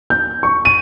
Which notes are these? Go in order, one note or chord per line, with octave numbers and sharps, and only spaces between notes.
G6
C#6
D#7